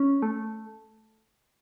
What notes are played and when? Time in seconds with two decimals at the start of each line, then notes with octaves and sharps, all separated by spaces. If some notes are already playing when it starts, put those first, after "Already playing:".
Already playing: C#4
0.22 A3